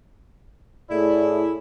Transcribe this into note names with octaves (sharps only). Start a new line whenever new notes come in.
A2 E4 G#4 D5